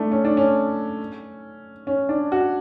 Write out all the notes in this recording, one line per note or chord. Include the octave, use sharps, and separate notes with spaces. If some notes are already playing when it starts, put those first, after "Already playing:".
Already playing: A3 D4 E4
C#4
D4
C#4
C#4
D4
F#4